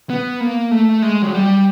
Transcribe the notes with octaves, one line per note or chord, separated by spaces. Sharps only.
B3
A#3
A3
G#3
F#3
G3